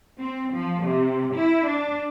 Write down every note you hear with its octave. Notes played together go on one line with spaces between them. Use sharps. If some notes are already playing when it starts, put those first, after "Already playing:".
C4
F3
C3
E4
D4